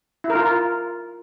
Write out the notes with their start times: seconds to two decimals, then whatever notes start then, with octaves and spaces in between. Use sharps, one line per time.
0.24 E4
0.30 A#4
0.35 F4